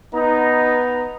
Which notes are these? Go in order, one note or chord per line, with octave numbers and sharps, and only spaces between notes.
B3 D#4 A#5